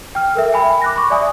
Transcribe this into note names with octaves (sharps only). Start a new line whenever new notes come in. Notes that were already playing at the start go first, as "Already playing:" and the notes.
G5 F6
A4 A#4 E5
G5 G#5 B5
D6 F#6 A#6
B5 C#6
D5 E5 G#5 D#6